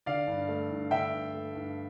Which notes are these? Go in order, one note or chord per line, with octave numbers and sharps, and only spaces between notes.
D3 D5 F5
G2
A3
G2
D3 E5 G5
G2
A3
G2